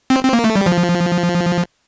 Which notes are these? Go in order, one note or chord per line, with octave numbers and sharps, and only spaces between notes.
C4
C4
A#3
A3
G3
F3